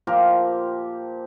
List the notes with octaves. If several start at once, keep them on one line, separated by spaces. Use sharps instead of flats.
A#2 F3 G4 A#4